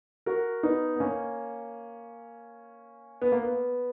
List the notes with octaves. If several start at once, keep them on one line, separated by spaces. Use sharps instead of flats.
F#4 A#4
B3 D#4
B3
A#3 C#4
B3
A#3
B3